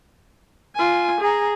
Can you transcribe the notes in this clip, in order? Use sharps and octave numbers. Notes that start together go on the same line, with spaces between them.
F4 G#5
G#4 A#5